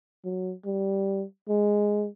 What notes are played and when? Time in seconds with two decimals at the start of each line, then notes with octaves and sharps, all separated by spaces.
0.25 F#3
0.66 G3
1.49 G#3